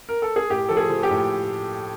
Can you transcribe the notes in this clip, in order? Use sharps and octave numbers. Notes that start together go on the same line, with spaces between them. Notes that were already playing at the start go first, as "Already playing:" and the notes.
A#4
A4
G#4
A2 G4
F3 A4
G#4
F3
G4
A2